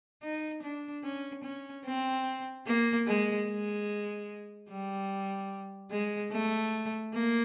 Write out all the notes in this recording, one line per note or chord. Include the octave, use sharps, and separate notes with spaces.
D#4
D4
C#4
C#4
C4
A#3
G#3
G#3
G3
G#3
A3
A#3